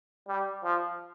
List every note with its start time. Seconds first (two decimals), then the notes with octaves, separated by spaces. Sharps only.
0.28 G3
0.64 F3